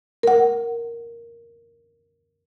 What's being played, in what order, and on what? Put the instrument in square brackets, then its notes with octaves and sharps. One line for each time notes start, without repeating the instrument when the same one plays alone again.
[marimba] A#4 F#5